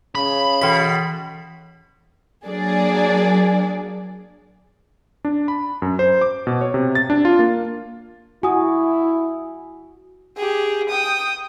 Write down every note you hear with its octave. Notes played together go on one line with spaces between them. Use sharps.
C#3 B5
B2 E3 B6
F#3 A#3 D4 G#4 D5
D4
B5
F#2
C5
D6
B2
C#5
C3
A6
D4
F4
A#3
E4 F#4 G#5 D#6
G4 G#4
G5 D#6